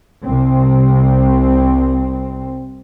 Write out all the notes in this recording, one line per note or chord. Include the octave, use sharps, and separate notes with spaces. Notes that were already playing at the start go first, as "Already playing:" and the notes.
C2 C4